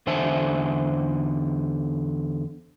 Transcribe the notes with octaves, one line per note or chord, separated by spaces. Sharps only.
E2 D3 C5 E5 G#5 A5